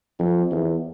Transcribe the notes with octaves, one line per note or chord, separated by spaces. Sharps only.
F2
E2